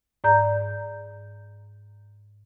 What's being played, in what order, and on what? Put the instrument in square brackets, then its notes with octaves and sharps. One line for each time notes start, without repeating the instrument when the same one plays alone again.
[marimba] G#2 D5 A#5 G6